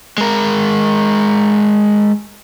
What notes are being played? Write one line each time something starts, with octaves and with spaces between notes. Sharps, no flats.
G#3 A#4